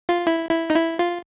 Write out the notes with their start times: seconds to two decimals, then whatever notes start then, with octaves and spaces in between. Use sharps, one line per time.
0.09 F4
0.27 E4
0.51 E4
0.70 D#4
0.76 E4
0.99 F4